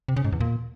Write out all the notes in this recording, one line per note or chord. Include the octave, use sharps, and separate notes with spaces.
C3
C#3
G#2
E2
A#2